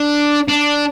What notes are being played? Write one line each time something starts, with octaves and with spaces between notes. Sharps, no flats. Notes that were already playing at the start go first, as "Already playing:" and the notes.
Already playing: D4
D4